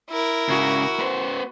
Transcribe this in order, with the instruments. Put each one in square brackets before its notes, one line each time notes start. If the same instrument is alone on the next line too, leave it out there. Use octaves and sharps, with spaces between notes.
[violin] E4 A#4
[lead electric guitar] G#2 C#3 [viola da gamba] F#4
[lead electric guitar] B3 C5